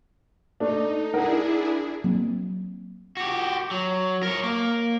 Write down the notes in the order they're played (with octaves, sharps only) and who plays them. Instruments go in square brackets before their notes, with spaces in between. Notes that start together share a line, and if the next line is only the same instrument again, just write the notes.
[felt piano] A3 D4 [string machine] D#4
[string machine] D4 E4 G#4 [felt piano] A#4 F#5
[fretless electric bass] F#3 A#3 C4
[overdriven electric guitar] F#4 G4
F#3
A#4 C#5
A#3